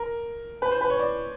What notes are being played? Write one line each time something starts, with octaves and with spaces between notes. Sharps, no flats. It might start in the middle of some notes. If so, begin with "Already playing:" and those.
Already playing: A#4
B4
C5
B4
C#5
D5